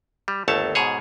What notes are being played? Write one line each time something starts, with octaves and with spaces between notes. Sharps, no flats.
G3
G1 D#2 A3 C#5 A5
G#2 B2 G#4 C#5